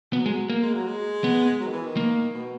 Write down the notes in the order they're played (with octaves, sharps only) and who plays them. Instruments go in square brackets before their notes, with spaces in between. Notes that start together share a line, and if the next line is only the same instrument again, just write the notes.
[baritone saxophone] F#3 [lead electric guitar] B3
[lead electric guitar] G#3
A#3
[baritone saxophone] G#3
F#3
G#3
[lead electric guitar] B3
[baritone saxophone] F#3
D#3
E3
D#3
[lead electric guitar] A#3
[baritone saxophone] B2